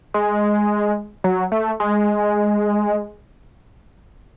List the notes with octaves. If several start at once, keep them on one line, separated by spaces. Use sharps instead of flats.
G#3
F#3
A3
G#3